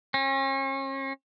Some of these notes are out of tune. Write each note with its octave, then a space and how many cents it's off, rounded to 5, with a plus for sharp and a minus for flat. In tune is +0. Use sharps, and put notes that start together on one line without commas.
C#4 -40